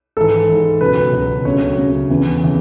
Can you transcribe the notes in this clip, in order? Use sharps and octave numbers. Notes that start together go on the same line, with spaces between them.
G#2 E3 A4
G#2 E3
C#2 B2 F#3 B4
C#2 B2 F#3
D2 C#3 F#3 C#5
D2 C#3 F#3
E2 C#3 E3
C#3 E3